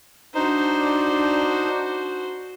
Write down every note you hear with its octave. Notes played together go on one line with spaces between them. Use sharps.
D4 D#4 F#4 C5